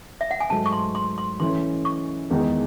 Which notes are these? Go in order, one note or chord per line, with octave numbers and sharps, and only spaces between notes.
E5
F#5
G#5
G#2 F#3 A3 A5
C#6
C6
C6
C6
E3 A3 C#4 C6
C#6
E2 D#3 G#3 D#4